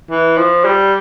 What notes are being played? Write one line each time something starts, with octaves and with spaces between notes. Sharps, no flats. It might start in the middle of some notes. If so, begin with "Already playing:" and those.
E3
F3
G3